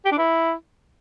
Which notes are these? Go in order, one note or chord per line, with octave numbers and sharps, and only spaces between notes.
G4
D4
E4